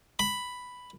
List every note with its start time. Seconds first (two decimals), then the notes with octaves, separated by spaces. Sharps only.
0.19 B5